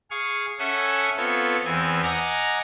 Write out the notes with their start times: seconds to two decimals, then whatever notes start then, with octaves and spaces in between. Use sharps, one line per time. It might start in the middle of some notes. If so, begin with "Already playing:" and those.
0.11 G#4 F5 C#6
0.59 C#4 A4 E5 F#5 G#5
1.17 B3 C4 F4 A4 C#5
1.65 E2 E3 C4 G#5
2.03 D#5 F#5 G#5 A#5 D6 F6